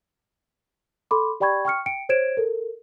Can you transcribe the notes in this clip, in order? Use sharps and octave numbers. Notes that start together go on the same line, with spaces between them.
A4 B5 C6 D6
G4 D5 G5 B5 C#6 G#6
G5 C#6 F6 C#7
G5 C#7 D7
C5 C#5 G#6 D7 E7
A4 A#4